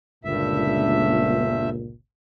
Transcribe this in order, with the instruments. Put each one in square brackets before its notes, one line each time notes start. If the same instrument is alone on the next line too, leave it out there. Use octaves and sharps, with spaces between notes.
[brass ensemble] G1 C#2 A#2 [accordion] G2 E5